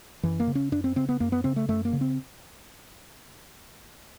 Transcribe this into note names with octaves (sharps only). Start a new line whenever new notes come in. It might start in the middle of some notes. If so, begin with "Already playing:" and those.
F#2 E3
A#3
C#3
C#4
F#2 D4
C4
C#3 C4
B3
F#2 A#3
B3
C#3 C4
A3
F#2 A3
A#3
C#3
C4